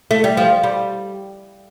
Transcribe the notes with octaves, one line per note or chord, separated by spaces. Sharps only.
A3
G3
F3
G3